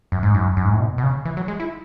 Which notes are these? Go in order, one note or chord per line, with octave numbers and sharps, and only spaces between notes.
F#2
G#2
F#2
F#2
G#2
A2
B2
B2
C#3
E3
F#3
G#3
E4